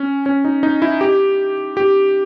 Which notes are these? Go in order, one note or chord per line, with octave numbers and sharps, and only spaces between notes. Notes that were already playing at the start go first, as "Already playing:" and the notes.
Already playing: C#4
C#4
D#4
D#4
E4
G4
G4